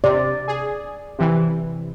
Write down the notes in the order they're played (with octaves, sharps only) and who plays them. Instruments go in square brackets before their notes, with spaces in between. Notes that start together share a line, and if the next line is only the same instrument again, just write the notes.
[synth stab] C3 [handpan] D5
[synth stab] G#4
C3 E3